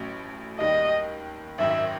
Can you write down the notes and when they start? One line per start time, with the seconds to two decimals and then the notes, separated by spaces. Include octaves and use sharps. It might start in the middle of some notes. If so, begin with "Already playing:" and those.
Already playing: A1 A2 F#3 A3 C#4
0.59 D#2 D#3 G3 D#5
1.58 G#1 F#2 D#3 E5